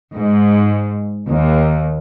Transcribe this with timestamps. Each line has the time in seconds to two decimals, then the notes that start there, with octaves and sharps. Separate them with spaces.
0.14 G#2
1.28 D#2